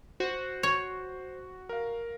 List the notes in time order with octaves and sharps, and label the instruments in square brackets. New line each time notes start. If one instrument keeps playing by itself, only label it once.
[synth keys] F#4 [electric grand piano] C5
[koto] C#5
[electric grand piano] A#4 F5